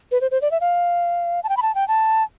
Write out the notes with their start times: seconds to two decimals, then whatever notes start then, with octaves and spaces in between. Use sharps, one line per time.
0.12 B4
0.21 C5
0.31 C5
0.42 D5
0.51 E5
0.61 F5
1.44 A5
1.49 G5
1.57 B5
1.62 A5
1.75 G5
1.88 A5